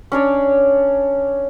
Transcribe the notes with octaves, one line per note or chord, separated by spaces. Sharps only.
C#4 D4 C#5 D5